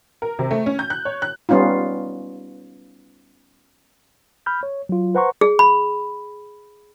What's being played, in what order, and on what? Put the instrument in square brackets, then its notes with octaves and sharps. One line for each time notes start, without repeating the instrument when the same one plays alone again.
[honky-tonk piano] A#4
C3
A3
C#4
G6
F#6
C#5
F#6
[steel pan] G3 B3 C#4 D#4 F4
[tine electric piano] B5 F6 G6
C#5
F#3 F4
B4 C5 F#5 A#5 C6 C#6
[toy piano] G#4
B5